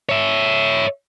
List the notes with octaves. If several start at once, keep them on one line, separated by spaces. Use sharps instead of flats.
C#5 E5